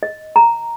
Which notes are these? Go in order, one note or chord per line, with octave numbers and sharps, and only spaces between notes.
D#5
A#5